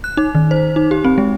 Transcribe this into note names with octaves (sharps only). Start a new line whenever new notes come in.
F#6
D#4
D#3
C5
D#4
G4
C4
G#3